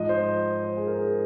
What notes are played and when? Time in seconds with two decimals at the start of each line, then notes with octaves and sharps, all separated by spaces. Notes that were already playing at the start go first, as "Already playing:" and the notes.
Already playing: G#2 F3 D#5
0.09 C5
0.64 C5
0.77 G#4
0.87 A#4
0.98 G#4